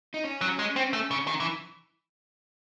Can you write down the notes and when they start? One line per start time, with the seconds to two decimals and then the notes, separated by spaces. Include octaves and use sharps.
0.14 D#4
0.24 C#4
0.41 F#3
0.59 G#3
0.76 C4
0.93 A3
1.11 C#3
1.27 D#3
1.40 E3